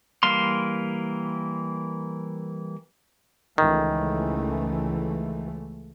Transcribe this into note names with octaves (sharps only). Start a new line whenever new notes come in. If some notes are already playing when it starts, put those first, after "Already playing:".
E3 G3 A#3 F5 C6
C#2 D#3 E3 A3